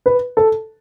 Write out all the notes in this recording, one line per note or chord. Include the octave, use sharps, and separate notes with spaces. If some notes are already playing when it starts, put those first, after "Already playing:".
B4
A4